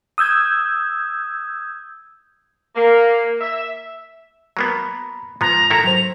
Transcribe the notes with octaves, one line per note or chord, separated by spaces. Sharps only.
D#6 E6 G6 G#6
A#3
E5
F#3 A#3 B3 A#5 B5
G#2 F3 B3 A#5 F#6
D#3 E4 A4 A#5
F#3 C5 F7